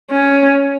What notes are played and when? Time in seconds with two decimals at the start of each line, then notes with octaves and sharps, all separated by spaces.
0.11 C#4